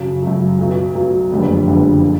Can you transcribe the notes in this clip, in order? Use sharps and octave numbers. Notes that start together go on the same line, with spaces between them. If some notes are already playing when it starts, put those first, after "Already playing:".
Already playing: F#2 C#3 F#3
F#2 C#3 F#3
B1 B2 F#3
B1 B2 F#3
F#1 F2 D3 G3 B3
F#1 F2 D3 G3 B3
A#2 F3